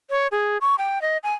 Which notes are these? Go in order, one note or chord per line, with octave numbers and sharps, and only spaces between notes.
C#5
G#4
C#6
G5
D#5
G#5